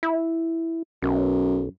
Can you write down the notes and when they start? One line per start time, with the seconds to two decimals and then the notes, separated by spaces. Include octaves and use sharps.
0.03 E4
1.02 B1 F#2